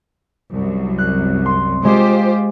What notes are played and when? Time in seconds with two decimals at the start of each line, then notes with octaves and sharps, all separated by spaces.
0.52 C2 F#2
0.98 F#6
1.46 C6
1.85 G#3 F4 G4 C5